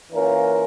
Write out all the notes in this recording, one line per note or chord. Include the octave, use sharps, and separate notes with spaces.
E3 A#3 C#4 F4 A#4